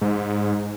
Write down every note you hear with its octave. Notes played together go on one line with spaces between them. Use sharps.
G#2